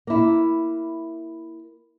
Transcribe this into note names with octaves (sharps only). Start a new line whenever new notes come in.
A#3 E4